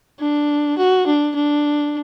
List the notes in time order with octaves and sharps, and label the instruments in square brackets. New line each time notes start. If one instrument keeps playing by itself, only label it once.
[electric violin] D4
F#4
D4
D4